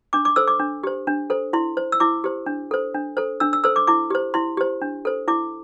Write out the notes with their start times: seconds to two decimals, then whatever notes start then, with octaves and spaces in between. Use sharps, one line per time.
0.13 D4 D6
0.25 D6
0.36 A4 C5 E6
0.47 D6
0.59 D4
0.84 G4 C5
1.07 D4
1.30 A4 C5
1.53 E4 C6
1.77 C5
1.92 E6
2.00 E4 D6
2.24 G4 C5
2.46 D4
2.71 A4 C5
2.94 D4
3.17 A4 C5
3.40 D4 E6
3.53 E6
3.64 A4 C5 E6
3.76 D6
3.87 E4 D6
4.10 G4 C5
4.34 E4 C6
4.57 G4 C5
4.82 D4
5.05 A4 C5
5.28 E4 D6